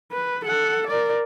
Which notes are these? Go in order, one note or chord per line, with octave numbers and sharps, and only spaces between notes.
B4
A4 F#5
A#4 D5